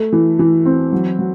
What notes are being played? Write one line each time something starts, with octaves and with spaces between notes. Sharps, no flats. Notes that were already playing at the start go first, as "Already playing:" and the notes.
Already playing: A3
E3
E3
C4
F#3
F#3